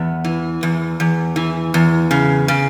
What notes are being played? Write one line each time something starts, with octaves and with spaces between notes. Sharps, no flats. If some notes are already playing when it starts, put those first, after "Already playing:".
Already playing: E2 B3
E3
E2
E2
E3
E2
C#3
C#3